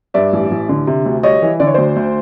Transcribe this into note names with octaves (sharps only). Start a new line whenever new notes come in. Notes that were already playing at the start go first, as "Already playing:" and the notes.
G2 D5 E5
A1
A1
D3
C3
D2
G3 C#5 D#5
E3
D3 D5
C#5
D2 C5 D5
D2